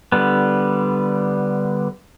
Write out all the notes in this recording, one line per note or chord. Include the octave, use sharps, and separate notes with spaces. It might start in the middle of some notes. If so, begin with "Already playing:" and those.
D3 G3 B3